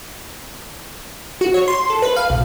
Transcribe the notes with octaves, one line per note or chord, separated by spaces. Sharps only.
F#4
C#5
C6
A4
B4
F5
B1